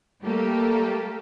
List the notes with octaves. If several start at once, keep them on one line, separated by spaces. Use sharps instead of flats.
G3 A3 A#3 G4 A4